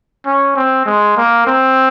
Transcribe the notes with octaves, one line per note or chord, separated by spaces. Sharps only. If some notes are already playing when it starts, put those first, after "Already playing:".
C#4
C4
G#3
A#3
C4